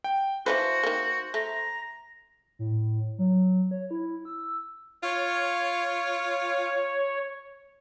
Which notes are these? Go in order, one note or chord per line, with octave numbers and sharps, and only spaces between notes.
G5
E3 F3 F#4 B4 C5
D#3 A#3
A3 A#5
A2
F#3
C#5
E4
E6
F4 C#5